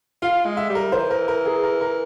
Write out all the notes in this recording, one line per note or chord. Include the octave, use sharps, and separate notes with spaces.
F4 F5
G#3
E5
G3
A#4
E3 C5
A#4
A#4
G#4
A#4
A#4